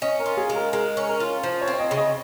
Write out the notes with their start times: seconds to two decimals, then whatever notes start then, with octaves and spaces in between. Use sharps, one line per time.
0.02 C#4 D#5
0.19 A#4
0.26 F4
0.37 G#4
0.50 G#3
0.55 A#4
0.72 G#3 A#4
0.97 C#4
1.08 A#4
1.20 F4
1.43 F3 C5
1.61 C#5
1.68 C4
1.74 C#5
1.79 D#5
1.91 C#3
1.97 D#5